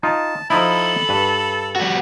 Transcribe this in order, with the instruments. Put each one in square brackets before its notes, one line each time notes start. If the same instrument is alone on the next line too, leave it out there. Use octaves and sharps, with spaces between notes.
[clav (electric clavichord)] D#4 F4 [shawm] A5
[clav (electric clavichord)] F3 D#4 E4 [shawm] A4 [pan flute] B5
[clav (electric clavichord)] G2 B4
[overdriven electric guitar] G3 F#4